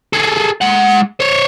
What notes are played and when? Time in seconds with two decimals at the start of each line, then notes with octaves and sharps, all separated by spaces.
0.13 G#4 A4
0.62 G#3 F#5
1.20 C5 C#5